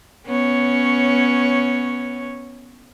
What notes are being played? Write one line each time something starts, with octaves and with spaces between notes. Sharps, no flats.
B3 C#4 C#5